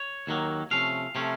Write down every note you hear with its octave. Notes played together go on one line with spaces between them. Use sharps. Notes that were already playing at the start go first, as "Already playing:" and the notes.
Already playing: C#5
D#2 D#3 F#3 A#3
C3 F3 A3 C#4 F5
C3 F3 A3 C#4